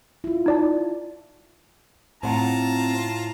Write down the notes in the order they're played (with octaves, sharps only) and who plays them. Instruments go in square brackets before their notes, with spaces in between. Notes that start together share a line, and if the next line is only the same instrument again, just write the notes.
[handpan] E4 F4
[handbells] D#4 D5 A5
[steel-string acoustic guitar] A2 F#5 [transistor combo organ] C4 [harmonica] F4 A5 [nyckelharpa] A#5